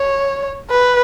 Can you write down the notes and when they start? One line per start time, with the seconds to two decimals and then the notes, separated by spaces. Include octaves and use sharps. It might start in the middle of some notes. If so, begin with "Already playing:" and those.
Already playing: C#5
0.71 B4